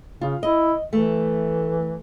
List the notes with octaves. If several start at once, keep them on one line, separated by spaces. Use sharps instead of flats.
C#3 F4
E4 D#5
E3 A3